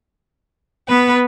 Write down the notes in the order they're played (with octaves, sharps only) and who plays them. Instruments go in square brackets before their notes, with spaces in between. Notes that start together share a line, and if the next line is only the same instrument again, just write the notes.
[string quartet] B3 B4